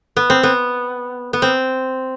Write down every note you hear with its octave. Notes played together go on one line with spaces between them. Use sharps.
B3
C4
B3
B3
C4